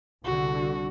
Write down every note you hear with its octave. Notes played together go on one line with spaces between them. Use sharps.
C2 D3 F#4